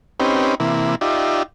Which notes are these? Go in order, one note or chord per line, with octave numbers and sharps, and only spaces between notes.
C4 C#4 D#4 G4 B4
C3 E3 A#3 E4
D#4 F4 G4 D5 E5